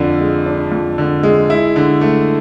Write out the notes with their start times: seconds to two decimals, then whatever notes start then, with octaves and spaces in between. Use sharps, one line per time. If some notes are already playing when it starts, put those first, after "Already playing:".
Already playing: F2 D3 D4
0.20 G#3
0.46 D4
0.72 F2
0.98 D3
1.23 G#3
1.50 E4
1.76 D3
2.01 A3